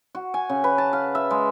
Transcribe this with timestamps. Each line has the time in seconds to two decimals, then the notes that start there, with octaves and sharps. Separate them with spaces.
0.15 F#4
0.34 G#5
0.49 C#3
0.64 B4
0.78 A5
0.93 F5
1.15 E5
1.31 G#3